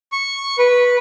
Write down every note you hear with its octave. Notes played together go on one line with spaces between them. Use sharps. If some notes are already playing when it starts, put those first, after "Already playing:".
C#6
B4